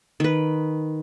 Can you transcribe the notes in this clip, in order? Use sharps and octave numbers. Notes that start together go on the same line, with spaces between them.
D#3 B4